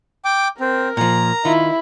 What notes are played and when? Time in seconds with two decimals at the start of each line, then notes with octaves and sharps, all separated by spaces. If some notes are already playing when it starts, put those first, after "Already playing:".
0.25 G5 D6
0.61 C4 A#4
0.97 A#2 F3 A#5
1.45 D#3 E4 F4